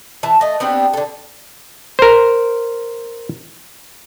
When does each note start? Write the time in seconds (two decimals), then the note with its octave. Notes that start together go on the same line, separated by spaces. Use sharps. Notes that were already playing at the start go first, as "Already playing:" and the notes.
0.23 E3 A5
0.41 A3 D#5
0.60 B3 C4 D4 G4
0.93 D3 A4
1.99 A#4 C5